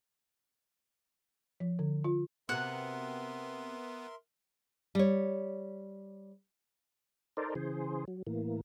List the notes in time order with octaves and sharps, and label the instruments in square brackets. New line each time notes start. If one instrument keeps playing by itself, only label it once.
[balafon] F3
D3
F4
[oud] C3 F#4 [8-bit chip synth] B3 [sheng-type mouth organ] A#4 E5 C6 [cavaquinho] F#5
[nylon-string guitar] G3 C#5
[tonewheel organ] D#4 A4 A#4 C5 D5
C#3 E3 G#4 C5
F#3
A2 E3 A#3